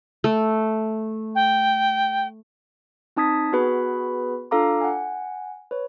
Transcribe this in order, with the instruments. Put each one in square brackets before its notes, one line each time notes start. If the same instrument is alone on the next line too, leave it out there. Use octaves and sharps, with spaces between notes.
[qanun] A3
[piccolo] G5
[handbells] C4 D#4 A5 D#6 G#6 B6
B3 F#4 G#4 B4 B5
D4 F4 A4 F5 A#5 D6
F#5 G#5
B4 C#5